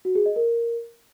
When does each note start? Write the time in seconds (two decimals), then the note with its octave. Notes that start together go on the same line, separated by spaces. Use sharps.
0.05 F#4
0.15 G#4
0.26 D#5
0.36 A#4